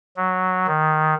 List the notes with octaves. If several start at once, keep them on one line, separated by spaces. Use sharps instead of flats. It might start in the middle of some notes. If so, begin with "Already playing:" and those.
F#3
D#3